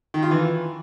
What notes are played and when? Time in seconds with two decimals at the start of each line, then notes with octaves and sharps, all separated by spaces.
0.14 D#3
0.23 F4
0.31 E3